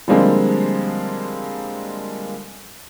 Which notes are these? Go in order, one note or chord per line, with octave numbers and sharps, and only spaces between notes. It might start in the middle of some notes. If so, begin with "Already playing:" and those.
D3 F3 G3 G#3 A#3 C4